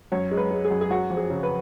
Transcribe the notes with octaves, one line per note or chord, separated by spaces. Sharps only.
F#2 C#5
G#3
B4
G#3
G#4
F#2
G#4
F#3 F#4
F2
G#4
C#3
B4